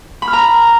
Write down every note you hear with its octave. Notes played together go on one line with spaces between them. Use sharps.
B5
F6
A#5